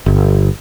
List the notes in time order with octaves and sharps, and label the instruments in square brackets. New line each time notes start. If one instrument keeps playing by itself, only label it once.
[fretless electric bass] G1